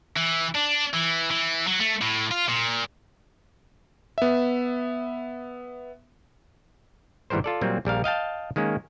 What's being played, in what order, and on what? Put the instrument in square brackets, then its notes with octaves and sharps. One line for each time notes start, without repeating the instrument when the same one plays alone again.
[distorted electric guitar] E3
D4
E3
E3
F#3
A3
A2
F4
A#2
[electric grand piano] B3 E5
[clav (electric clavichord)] G#1 E2 E3 G3 A#4 C5
F4 A4 D5
A#2 F#3 G3 A#3 C4
A#1 G3 A#4 F5
D#5 F5 G5 A5
D#3 G#3 A#3 C#4